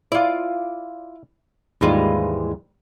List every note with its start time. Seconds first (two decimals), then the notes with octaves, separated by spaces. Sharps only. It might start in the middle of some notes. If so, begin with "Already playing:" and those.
0.12 E4 F4 D5 F5
1.81 D#2 G#2 E3 G3 G#3 F4